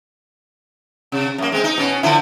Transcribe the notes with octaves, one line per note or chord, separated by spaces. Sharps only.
C3
F#2 A#3
G#3 C4
D#4
B2 C#4
D3 F3 E4